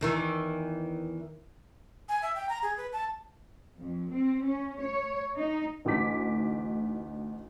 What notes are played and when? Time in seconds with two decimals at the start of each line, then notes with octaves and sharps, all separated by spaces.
0.01 E2 D#3 E3
2.09 G#5
2.22 E5
2.35 G5
2.49 A#5
2.62 G#4
2.77 B4
2.93 A5
3.78 F2
4.11 C4
4.43 C#4
4.79 C#5
5.36 D#4
5.85 A1 D2 D#4 D6 B6